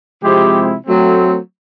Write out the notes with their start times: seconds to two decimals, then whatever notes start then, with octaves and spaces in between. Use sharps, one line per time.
0.22 C3 F3 G#3 C4 E4 G4
0.86 F#3 A3 C4